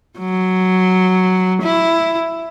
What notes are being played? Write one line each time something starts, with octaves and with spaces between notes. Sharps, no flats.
F#3
E4